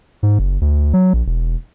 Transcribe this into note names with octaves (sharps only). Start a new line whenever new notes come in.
G#2
F#1
D2
F#3
A#1
E1